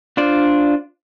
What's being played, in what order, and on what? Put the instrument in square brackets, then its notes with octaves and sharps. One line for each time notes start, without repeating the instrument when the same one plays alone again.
[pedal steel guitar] D4 F4 C5 D5